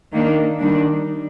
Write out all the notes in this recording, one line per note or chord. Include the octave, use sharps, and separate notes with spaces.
D#3 A#3 D4
D#3 G3 D4